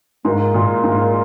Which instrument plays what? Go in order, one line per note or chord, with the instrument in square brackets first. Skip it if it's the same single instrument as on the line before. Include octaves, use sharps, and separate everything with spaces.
[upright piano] G#2 [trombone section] A#3 F4 A#4
[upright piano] A#2
G#2